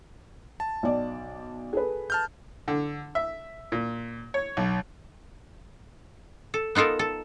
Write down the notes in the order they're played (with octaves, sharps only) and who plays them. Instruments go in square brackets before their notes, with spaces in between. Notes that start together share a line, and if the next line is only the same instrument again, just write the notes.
[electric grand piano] A5
[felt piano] B1 D5
G#4 A4 B4
[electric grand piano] A5 F6 G6
[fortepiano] D3
E5
A#2
C#5
B1
[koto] A4
B3 D#4 F4 A4 A#4
A4